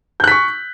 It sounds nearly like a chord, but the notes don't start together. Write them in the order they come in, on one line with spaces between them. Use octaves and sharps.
G6 F#6 B6 C#6